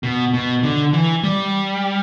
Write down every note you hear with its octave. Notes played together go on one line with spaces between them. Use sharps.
B2
B2
D3
E3
G3